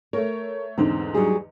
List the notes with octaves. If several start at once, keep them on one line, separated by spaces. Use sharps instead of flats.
A3 A#4 C#5
E2 G#2 D3 C4
F#3 G3 G#4